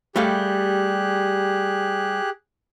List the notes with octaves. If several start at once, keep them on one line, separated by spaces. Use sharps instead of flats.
G3 A3 G4 G#4 F5 F#6